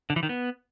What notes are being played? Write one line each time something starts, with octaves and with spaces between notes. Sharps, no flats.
D3
E3
D#3
B3